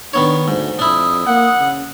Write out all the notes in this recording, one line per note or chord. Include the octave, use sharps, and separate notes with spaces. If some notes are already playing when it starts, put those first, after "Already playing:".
D#3 B3 D4 C#5
D2 G#2
F2 D4 E4 D#6
A#3 F#5
C#3